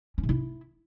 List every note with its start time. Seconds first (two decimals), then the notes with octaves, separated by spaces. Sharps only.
0.18 C#4
0.23 C3
0.29 E4